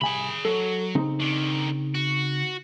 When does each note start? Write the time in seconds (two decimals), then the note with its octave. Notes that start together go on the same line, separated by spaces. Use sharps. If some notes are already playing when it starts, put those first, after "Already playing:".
0.01 C2 G#4 G#5 B5
0.45 F#3 A4
0.95 C#3 C4 D#4
1.20 D3 D#3
1.94 F#4